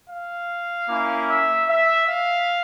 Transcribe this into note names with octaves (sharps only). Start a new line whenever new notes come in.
F5
A#3 C#4 E4
E5
E5
F5